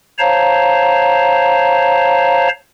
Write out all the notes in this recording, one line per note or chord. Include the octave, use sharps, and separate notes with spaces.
C5 C#5 F5 A5 A#5